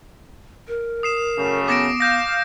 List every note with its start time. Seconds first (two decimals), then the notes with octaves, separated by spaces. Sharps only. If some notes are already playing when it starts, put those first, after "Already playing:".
0.68 A#4
1.03 D#6 C7 E7
1.36 F#2 C#3 A3
1.68 B3 D6 A#6 D7
2.00 F5 G6 A#6